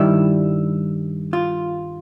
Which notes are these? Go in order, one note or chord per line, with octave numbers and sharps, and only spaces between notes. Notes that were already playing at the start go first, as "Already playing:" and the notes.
Already playing: G2 D#3 G3 E4
F4